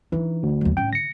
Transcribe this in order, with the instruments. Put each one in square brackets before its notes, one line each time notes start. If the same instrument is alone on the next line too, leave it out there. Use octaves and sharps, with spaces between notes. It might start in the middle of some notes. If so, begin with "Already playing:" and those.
[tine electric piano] E3 [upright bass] D4 D#4
[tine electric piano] D2
[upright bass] D#2 F#3
[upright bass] A2 C#4 [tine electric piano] G5
[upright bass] D3 [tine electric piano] A#6 C#7